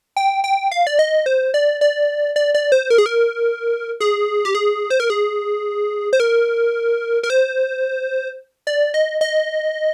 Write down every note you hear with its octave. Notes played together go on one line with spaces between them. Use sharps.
G5
G5
F5
D5
D#5
C5
D5
D5
D5
D5
C5
A#4
G#4
A#4
G#4
G4
G#4
C5
A#4
G#4
C5
A#4
A#4
C5
D5
D#5
D#5